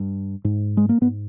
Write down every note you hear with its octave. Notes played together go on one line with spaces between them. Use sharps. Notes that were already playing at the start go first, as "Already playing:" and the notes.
Already playing: G2
G#2
G#3
A#3
G#2 B3